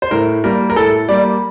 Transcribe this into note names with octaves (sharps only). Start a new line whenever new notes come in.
C5
A2 A#4
G3 A#3 A#4
A#4
A2 A4
G3 A#3 D5